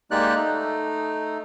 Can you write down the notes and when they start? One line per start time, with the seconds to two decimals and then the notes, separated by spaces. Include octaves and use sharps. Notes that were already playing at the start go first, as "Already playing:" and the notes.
0.11 G#3 A#3 D#4 G4 D5 F#6
0.35 A3 D#4